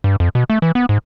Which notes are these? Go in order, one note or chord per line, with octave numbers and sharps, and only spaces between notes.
G2
F2
B2
A3
E3
B3
G#2